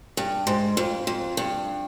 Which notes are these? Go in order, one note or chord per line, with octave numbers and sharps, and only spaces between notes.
G2
G#2
F2
F2
G2